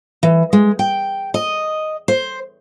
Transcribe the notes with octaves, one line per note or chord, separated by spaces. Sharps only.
E3
G#3
G5
D#5
C5